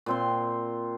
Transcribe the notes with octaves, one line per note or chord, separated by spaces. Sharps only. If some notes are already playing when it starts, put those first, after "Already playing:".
A#2 C4 C6